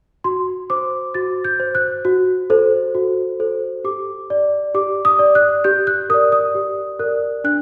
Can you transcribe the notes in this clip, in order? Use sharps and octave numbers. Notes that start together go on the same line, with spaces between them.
F#4 C6
C5 D6
F#4 A6
G6
C5
F#6
F#4
A4 C5
F#4
A4 C5
G4 D6
D5
G4 D6
D#6
D5
F#6
G4 G6
F#6
A#4 D5 D#6
D#6
G4
A#4 D5 F#6
D4 F#6